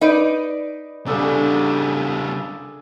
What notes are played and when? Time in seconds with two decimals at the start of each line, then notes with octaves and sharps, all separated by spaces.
0.01 D#4 B4 D5
1.06 C#3 G3 D4 G#4 A4